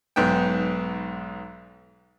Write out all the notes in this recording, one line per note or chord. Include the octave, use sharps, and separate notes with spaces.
B1 G#2 B3 G5